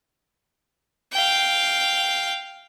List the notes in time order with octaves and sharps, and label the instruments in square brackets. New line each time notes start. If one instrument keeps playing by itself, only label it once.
[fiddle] F5 G5